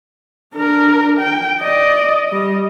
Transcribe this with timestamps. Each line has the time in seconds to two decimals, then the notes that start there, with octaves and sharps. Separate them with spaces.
0.54 D4 A#4
1.20 G5
1.61 D5 D#5
2.28 G3 D#5